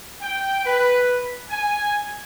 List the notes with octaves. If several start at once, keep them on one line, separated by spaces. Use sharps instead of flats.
G5
B4
G#5